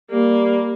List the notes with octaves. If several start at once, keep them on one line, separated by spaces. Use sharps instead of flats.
G3 A#3